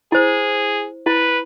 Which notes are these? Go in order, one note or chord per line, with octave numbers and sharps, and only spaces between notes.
E4 G#4 C5
E4 B4